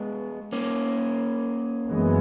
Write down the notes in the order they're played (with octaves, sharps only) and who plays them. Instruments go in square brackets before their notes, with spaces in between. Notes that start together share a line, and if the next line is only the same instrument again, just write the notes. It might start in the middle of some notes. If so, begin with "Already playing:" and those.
Already playing: [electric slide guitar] G#3 B3
A#3 C#4
[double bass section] F#2 E3 G#3 B3